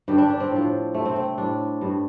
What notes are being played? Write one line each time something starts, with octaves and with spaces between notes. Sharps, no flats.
G2 D3 G3 G4
D4
D4
C4
A2 F3
C3 G3 A3
C4
C4
A2 G3 D4
G2 G3